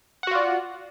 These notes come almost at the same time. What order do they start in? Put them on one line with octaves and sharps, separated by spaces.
F#5 F#4 F4 D5